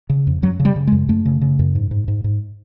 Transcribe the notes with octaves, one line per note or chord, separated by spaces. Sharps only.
C#3
F2
F#2 F#3
C#3
G3
C#3
G#3
F#2
F#2 A3
C#3
C#3
F#2
G#2
G#2
G#2
G#2